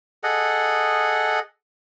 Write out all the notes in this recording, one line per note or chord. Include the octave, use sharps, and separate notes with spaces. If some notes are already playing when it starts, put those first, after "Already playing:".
G#4 A4 D#5 F#5